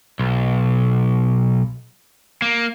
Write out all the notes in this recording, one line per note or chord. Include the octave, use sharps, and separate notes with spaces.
B1
A#3